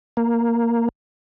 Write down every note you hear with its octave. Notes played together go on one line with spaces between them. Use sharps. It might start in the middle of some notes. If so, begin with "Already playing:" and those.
A#3